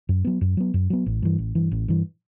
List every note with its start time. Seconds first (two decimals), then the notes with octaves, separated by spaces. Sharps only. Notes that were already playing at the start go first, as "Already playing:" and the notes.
0.09 F#2
0.25 F#3 B3
0.41 F#2
0.57 F#3 B3
0.74 F#2
0.90 F#3 B3
1.06 A1
1.22 G2 E3
1.38 A1
1.55 G2 E3
1.72 A1
1.88 G2 E3